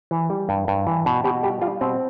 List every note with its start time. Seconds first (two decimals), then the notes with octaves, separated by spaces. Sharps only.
0.11 E3
0.30 G3
0.49 G2
0.68 G2
0.87 E3
1.06 B2
1.24 B2 G4
1.43 G3 G4
1.62 G3 F4
1.81 B2 C4